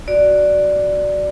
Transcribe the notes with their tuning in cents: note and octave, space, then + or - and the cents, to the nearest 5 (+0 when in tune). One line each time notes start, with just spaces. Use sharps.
F#4 +0 D5 +0